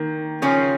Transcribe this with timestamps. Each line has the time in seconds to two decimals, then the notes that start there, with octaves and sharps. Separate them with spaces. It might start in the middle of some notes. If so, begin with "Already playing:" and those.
Already playing: D#3 A#3
0.42 C#3 F3 A#3 C#4